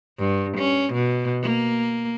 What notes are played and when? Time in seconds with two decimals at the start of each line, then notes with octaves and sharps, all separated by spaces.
0.19 G2
0.58 C#4
0.93 B2
1.42 A#3